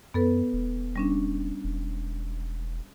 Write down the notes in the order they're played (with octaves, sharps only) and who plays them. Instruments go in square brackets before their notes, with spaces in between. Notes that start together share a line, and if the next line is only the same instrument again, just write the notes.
[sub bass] F#2 [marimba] B3 A4 B4
[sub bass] E1
[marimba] G3 C#4 D4
[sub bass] E1